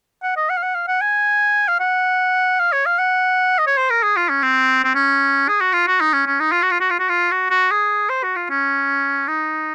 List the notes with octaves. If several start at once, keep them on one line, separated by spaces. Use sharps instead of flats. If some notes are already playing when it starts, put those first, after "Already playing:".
F#5
D#5
F#5
F5
F#5
F5
F#5
G#5
F5
F#5
F5
C#5
F5
F#5
D#5
C#5
C5
A#4
G#4
F4
C#4
C4
C4
C#4
G#4
F#4
F4
F#4
D#4
C#4
C#4
D#4
F4
F#4
F4
F#4
F4
F#4
F4
F#4
F#4
G#4
C5
F#4
F4
C#4
D#4